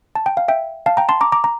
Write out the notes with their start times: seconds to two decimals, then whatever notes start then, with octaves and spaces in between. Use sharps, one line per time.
0.15 A5
0.26 G5
0.37 F5
0.48 E5 G5
0.86 F5 A5
0.97 G5 A#5
1.09 A5 C6
1.21 A#5 D6
1.32 A#5 D6
1.44 A#5